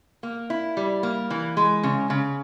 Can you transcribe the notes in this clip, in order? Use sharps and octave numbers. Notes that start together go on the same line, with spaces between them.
A#3
E4
G3
A#3
E3
G#3
C#3
C#3